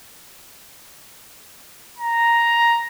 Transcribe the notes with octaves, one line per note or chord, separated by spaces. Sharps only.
A#5